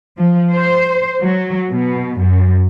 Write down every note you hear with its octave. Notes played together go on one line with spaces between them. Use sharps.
F3
C5
F#3
B2
F#2